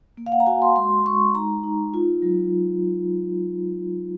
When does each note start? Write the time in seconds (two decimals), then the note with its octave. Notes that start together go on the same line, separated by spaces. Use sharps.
0.17 A#3
0.26 F5
0.32 F#5
0.40 A#5
0.46 F#4 G#5
0.62 C6
0.76 G#3 C6
1.05 G#3 C#6
1.35 D#4 A#5
1.64 D#4
1.94 F4
2.22 F#3